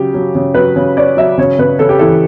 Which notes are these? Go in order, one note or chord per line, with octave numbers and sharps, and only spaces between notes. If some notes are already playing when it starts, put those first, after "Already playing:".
Already playing: C#3 F#3 G4
F#3
C#3
F#3 B4
C#3
C#4 D5
F#3 E5
C#3 C#5
C#3 B4
C#3 A4
G4
E3 A4